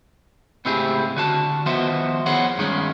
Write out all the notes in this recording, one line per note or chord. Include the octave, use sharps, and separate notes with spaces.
C#2 A2 C4 E4 G4 G#4
D3 F#4 A5
D#3 F3 B3 F#4 C5 E5
B3 E4 G#4 C5 C#5 F#5
G2 D#3 G#3 C#4